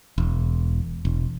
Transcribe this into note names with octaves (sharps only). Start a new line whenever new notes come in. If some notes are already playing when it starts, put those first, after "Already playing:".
E1
E1